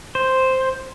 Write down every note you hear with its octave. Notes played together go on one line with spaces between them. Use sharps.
C5